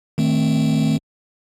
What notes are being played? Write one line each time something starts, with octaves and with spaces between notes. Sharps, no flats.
D#3 A3 C4